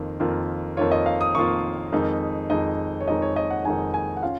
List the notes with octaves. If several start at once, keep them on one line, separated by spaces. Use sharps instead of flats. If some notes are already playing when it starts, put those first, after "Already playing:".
Already playing: F2 D#3 A#3 F4
F2 D#3 A#3 F4
F2 D#3 A#3 F4 C#5
D#5
F5
D#6
F2 D#3 A#3 F4 C#6
F2 D#3 G#3 D#4
F2 D#3 G#3 D#4 D#5
C#5
F2 D#3 G#3 D#4 D#5
C#5
D#5
F#5
F2 D#3 G#3 D#4 G#5
G#5
F#5
C#4 F4 F5